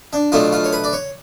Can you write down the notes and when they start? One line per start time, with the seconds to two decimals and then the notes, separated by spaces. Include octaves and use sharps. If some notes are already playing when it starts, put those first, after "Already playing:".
0.13 D4
0.32 B2 F#3 A3 D4 F4
0.53 F4
0.64 C#5
0.73 B4
0.84 D5
0.93 C#5